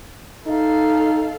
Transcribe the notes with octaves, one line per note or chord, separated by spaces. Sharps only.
D#4 A4 F5